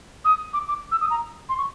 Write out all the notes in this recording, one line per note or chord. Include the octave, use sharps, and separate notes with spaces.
D#6
D6
D6
E6
D#6
A#5
C6
C#6